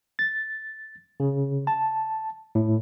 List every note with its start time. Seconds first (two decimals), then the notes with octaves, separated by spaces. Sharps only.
0.19 A6
1.20 C#3
1.67 A5
2.55 A2